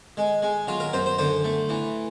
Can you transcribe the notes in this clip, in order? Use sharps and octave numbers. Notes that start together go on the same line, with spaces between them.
G#3
G#3
F#3 F4
A#4
F#2 C5
C5
D3 C5
A3
E3